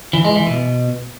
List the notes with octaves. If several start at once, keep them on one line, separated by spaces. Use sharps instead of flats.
E3
G#3
E3
B2